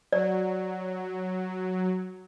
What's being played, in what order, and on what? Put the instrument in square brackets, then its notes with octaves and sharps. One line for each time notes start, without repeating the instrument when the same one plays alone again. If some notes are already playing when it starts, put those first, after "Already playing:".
[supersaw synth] F#3 [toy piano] D5